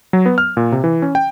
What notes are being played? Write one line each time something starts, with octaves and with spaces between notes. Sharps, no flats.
F#3
B3
F6
A#2
C3
E3
C#4
G5